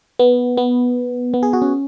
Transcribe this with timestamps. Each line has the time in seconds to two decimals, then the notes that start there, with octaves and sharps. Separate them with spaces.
0.19 B3
0.57 B3
1.34 B3
1.43 G#4
1.53 F#4
1.62 C#4